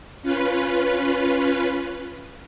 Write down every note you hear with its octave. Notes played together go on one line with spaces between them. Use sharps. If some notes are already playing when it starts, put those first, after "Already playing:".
C#4 F4 B4